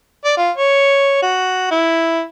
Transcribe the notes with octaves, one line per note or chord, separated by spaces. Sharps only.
D5
F4
C#5
F#4
E4